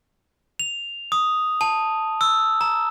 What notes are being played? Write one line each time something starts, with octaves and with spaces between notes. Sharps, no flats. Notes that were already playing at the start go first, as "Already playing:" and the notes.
F7
D#6
A5
E6
A#5